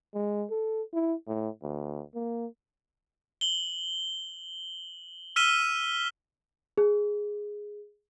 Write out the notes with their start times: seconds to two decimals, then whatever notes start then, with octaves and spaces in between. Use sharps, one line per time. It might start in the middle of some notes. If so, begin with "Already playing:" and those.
0.14 G#3
0.51 A4
0.93 E4
1.27 A2
1.62 D2
2.15 A#3
3.41 F#7 G7
5.36 E6 F6 B6 D#7 E7 G7
6.78 G#4